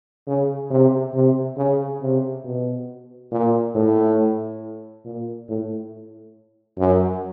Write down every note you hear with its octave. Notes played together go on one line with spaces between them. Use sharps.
C#3
C3
C3
C#3
C3
B2
A#2
A2
A#2
A2
F#2